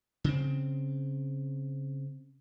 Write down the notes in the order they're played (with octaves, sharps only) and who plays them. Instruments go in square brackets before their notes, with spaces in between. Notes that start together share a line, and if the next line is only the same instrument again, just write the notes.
[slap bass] C#3 C4